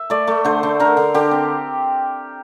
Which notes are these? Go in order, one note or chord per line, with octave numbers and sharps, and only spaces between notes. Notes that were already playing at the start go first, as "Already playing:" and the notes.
Already playing: E5
A3 D5
A3
D3 C5
D3
D3 A#4
D3
D3 G4
C4